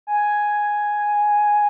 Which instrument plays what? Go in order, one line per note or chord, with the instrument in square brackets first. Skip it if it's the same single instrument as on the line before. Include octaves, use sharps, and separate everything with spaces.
[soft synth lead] G#5